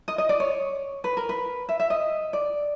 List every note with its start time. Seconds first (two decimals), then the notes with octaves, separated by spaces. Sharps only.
0.08 D#5
0.18 D#5
0.29 D5
0.40 C#5
1.04 B4
1.17 A#4
1.29 B4
1.69 E5
1.80 E5
1.90 D#5
2.33 D5